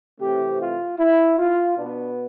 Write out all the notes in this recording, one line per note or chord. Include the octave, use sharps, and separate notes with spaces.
C3 E3 A3 C4 G4
F4
E4
F4
B2 B3 D4